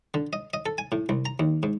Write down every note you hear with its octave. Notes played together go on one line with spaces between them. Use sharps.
D3
D#5
D#5
A4
G#5
A2
C2
A#5
D#2
G#2